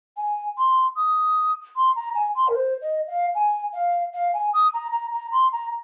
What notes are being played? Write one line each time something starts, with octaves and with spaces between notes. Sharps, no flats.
G#5
C6
D#6
C6
A#5
G#5
C6
A#4
C5
D#5
F5
G#5
F5
F5
G#5
D#6
A#5
A#5
A#5
C6
A#5